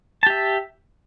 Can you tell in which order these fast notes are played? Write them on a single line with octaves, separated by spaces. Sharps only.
A5 G4 E5